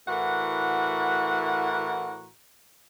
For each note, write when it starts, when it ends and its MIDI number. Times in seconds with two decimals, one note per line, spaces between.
0.08 2.30 45
0.08 2.30 52
0.08 2.30 66
0.08 2.30 70
0.08 2.30 78